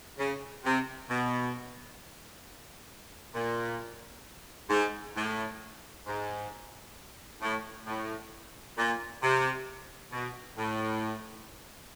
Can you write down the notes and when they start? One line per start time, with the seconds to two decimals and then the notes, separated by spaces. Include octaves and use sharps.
0.19 C#3
0.64 C3
1.09 B2
3.35 A#2
4.70 G#2
5.16 A2
6.06 G#2
7.41 A2
7.86 A2
8.77 A#2
9.22 C3
10.13 B2
10.57 A2